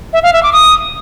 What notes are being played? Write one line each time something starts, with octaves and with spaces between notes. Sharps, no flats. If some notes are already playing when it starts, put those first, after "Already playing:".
E5
F5
E5
D6
D#6